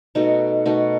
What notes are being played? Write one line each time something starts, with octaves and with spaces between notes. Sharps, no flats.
B2 A3 D#4 F#4
B2 A3 D#4 F#4